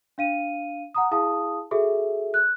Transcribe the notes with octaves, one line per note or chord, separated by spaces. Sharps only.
D4 F5 D#7
F#5 A#5 D#6
E4 G#4 F5 A5 D#6
F#4 G#4 A4 E5
F#6